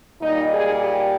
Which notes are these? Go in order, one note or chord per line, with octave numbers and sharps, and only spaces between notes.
A#2 G3 D#4
G#4
G4